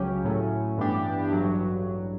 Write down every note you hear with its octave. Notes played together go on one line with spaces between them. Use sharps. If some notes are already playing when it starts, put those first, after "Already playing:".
Already playing: C#2 C#3 F#3 C#4 G4
A2 F#3 A3 C#4
G2 E3 B3 D4 G4
A1 G2 F#3